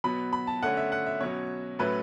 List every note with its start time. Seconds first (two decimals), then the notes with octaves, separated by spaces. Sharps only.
0.04 B2 F#3 B3 B5
0.33 B5
0.47 A5
0.62 D3 A3 C#4 F#5
0.77 E5
0.92 F#5
1.06 E5
1.21 B2 F#3 C#4 C#5
1.79 A2 F#3 A3 C#4 B4